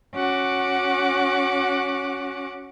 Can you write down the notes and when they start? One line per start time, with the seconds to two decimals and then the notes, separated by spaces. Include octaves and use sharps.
0.14 C#4 F#4 F#5 D6